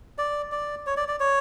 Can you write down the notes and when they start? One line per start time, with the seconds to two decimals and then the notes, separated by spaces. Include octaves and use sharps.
0.18 D5
0.52 D5
0.86 C#5
0.97 D5
1.08 D5
1.20 C#5